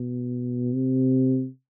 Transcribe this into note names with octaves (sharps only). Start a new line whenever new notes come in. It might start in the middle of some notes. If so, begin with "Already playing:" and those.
Already playing: B2
C3